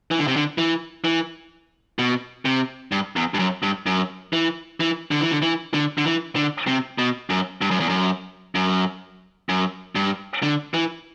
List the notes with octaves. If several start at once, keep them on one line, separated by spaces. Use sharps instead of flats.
E3
D3
C3
D3
E3
E3
B2
C3
G2
E2
G2
F#2
G2
F#2
E3
E3
D3
E3
D3
E3
D3
D3
E3
D3
C3
B2
F#2
G2
F#2
E2
F#2
F#2
F#2
G2
D3
E3